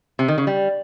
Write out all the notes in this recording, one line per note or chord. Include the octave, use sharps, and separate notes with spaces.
C3
D#3
C#3
G3